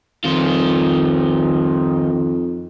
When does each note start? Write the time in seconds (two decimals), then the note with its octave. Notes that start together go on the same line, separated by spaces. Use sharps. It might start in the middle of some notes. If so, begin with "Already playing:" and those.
0.24 F2 D#3 F4